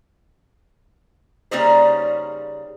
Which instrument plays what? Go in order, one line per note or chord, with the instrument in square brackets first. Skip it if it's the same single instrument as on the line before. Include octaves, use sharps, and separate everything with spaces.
[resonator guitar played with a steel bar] C#3 G3 A#3 C#4 D#4 C5